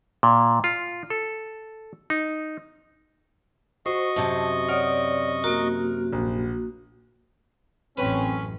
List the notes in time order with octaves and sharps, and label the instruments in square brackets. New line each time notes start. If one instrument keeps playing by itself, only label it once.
[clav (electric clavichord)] A#2
F4
A4
D#4
[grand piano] F#4 [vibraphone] C5 [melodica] D#5 C#6
[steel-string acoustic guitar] F#2 C3 [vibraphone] A5
[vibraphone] C#5 D5 [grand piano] F#5 D#6 F6
[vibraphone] A#3 F#4 [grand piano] A#4
[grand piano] A#1
[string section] A1 F#2 [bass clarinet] C4 [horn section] C#4 [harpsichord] B4